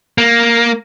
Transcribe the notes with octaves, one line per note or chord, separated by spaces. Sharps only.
A#3